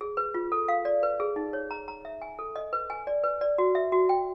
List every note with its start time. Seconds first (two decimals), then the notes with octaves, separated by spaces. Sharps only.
0.01 G#4
0.17 B4
0.34 F4
0.52 A4
0.68 F5
0.85 D5
1.03 B4
1.20 G#4
1.36 D#4
1.53 C#5
1.71 A#5
1.88 A#5
2.05 E5
2.22 G#5
2.39 A4
2.56 D#5
2.73 B4
2.90 G#5
3.07 D5
3.24 B4
3.41 D5
3.58 F#4
3.75 E5
3.92 F#4
4.09 G5